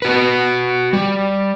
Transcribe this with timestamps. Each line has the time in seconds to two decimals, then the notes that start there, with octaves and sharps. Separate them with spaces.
0.02 F#4 B4
0.93 G3